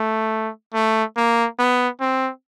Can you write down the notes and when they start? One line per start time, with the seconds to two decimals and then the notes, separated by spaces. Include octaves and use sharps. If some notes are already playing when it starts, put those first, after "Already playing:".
Already playing: A3
0.74 A3
1.16 A#3
1.59 B3
2.01 C4